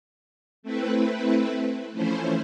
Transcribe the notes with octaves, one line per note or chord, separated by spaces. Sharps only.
A3 C4 E4 B4
E3 F3 A3 C#4 E4 C5